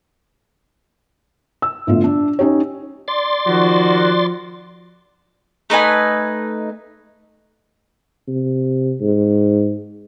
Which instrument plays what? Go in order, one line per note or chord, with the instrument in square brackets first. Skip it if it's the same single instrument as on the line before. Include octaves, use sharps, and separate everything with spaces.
[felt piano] E6
G1 A2 D3 F4
D4
C#4 D#4 G4 C#5
[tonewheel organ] D5 C6 A6
[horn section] D#3 F#4 [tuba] F3
[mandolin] A3 D#4 B4 G#5
[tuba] C3
G#2